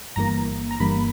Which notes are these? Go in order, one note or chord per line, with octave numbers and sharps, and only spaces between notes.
G1 G2 E3 A#3 A#5
A#5
G1 G2 E3 A#3 B5